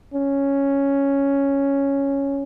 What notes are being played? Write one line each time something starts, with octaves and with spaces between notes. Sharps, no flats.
C#4